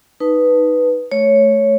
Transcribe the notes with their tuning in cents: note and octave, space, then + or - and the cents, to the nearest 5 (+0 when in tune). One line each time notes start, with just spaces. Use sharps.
D#4 +0 B4 +0 A5 +0
A3 -15 C#5 +0